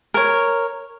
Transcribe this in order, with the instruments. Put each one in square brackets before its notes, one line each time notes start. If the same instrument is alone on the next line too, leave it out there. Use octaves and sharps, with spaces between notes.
[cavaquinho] A#4 C#5